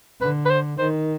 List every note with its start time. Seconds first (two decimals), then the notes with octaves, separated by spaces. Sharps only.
0.21 D3 B4
0.46 B4
0.50 C5
0.79 D#3 C5